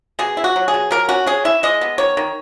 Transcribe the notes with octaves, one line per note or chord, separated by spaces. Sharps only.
B2 G#4
E4
F#4
F#3
G#4
B2
F#3 A#4
C#4 F#4
C#4 G#4
E4 E5
G#3 D#5
B3
D#3 C#5
D#3